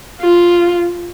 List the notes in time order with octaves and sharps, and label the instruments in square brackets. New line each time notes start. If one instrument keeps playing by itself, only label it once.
[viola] F4